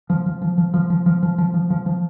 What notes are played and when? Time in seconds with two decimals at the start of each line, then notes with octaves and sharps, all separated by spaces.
0.10 F3
0.26 F3
0.42 F3
0.58 F3
0.74 F3
0.90 F3
1.06 F3
1.23 F3
1.38 F3
1.54 F3
1.70 F3
1.86 F3